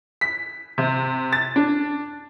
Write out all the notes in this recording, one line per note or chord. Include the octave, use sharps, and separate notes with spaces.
B6
C3
A6
D4